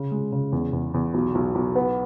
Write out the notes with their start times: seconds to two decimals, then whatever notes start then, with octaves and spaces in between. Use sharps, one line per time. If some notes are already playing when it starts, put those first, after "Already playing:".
Already playing: C#3
0.11 G#3
0.32 C#3
0.52 E2
0.73 E2
0.94 E2
1.14 B1
1.35 B1
1.55 B1
1.75 B3